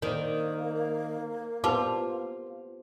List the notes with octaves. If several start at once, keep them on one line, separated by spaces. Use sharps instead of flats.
D#3 A#3 A#4 C5 D5
B3 F4 G4 B4 C5 A5 D6